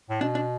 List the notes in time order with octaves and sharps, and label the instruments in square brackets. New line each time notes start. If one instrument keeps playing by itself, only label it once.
[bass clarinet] A2
[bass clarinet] B2 [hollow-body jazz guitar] D4
[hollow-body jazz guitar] D4